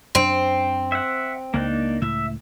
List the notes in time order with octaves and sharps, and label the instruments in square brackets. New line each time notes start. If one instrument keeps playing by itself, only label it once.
[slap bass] F#2 D4 [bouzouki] C4
[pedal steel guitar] E5 F#5
[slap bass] C#2 [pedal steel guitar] A#3 D4 D#4
[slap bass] C#2 A2 [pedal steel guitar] E5